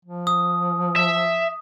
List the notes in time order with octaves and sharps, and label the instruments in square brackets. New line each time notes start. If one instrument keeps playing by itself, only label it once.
[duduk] F3
[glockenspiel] D#6
[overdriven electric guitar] E5